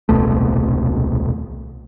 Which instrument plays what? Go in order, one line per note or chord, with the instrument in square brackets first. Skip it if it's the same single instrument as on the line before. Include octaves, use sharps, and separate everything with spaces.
[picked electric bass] D#1 C2 B2 A3